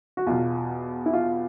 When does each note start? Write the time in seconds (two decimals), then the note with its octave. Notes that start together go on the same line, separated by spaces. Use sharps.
0.17 F#4
0.27 E2 B2 F4
1.06 E4
1.13 F4